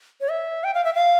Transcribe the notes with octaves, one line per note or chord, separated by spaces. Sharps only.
C#5
E5
G5
F5
E5
F5